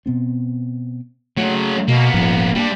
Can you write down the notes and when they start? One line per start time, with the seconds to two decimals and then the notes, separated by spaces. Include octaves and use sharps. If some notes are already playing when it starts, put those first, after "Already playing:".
0.06 B2 B3 C4
1.37 C#3 F#3 A3
1.88 B2 A#3 B3
2.14 D#1 G#2 F3
2.55 G3 A#3 D4